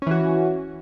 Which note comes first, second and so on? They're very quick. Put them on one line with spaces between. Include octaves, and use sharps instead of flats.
C#4 E3 F#4